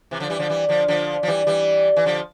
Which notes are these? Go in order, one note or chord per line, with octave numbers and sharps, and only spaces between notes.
C3 E3
D3 F3
E3 G3
D3 F3
E3 G3
D3 F3
D3 F3
F3
E3 G3
E3 G3
E3
D3 F3